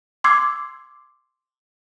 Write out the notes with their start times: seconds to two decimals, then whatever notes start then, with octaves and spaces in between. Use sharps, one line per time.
0.24 C6 D6 E6 G#6 C7